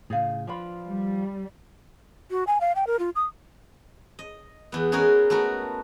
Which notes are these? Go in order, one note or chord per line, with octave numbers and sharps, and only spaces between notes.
A2 C#3 G#4 F5
F3 D4 F4 B4 B5
G3
F#4
G#5
F5
G5
A#4
F4
D#6
D#5
E2 B3
G#3 C#4 D#4 F#4 G#4 A#4
A3 B3 F#4 A#4